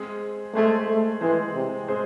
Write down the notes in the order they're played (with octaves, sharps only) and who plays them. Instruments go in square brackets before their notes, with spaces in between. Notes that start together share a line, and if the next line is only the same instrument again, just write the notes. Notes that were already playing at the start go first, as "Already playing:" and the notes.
Already playing: [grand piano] G#3 C4 G#4 C5
[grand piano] G#3 C4 G#4 C5 [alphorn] A3
[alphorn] A3
[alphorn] E3 [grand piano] G#3 C4 G#4 C5
[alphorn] C3
[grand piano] G#3 C4 G#4 C5